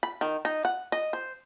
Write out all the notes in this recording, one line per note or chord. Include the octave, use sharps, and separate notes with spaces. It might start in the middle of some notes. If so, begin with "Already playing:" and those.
B5
D#3
D#4
F#5
D#5
C5